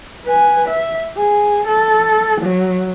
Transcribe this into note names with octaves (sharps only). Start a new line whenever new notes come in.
B4 G#5
E5
G#4
A4
F#3